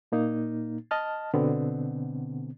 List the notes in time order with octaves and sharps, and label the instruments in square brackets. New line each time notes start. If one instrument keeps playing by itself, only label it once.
[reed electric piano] A#2 A#3 D#4
D#5 A5 F6
B2 D3 B3 C4